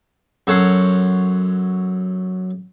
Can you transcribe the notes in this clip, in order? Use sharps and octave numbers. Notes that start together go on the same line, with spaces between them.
F#2 A4 C#5 F#5 C6